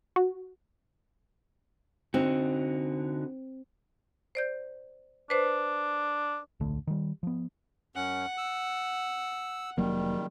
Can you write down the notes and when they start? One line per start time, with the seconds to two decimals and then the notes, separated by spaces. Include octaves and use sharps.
0.16 F#4
2.14 D3 C4 D#4 F#4
4.35 C5 D5 G6
5.30 D4 B4 C5
6.60 D1 B1 D3 A3
6.87 D#3 G3
7.23 F3 B3
7.96 F#2 C#4 F#5
8.38 E6
9.78 F1 D#3 F#3 G3 A#3